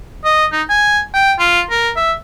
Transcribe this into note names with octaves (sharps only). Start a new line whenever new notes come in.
D#5
D#4
G#5
G5
F4
A#4
E5